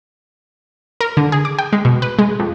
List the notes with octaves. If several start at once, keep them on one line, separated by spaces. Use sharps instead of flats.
A#4
D3
G#4
D6
G5
G#3
B2
B4
G#3
F2